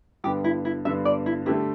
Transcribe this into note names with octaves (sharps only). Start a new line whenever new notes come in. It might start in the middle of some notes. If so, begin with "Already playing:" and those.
G2 D3 B3 G4
E4
E4
G2 D3 B3 E5
D5
E4
D3 A3 E4 G4